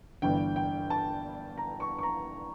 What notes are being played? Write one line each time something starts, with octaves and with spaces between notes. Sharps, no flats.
G1 G2 E3 G5
G5
A5
A#5
C#6
C#6
A#5